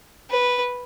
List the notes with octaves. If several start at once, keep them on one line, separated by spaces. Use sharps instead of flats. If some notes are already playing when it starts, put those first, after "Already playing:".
B4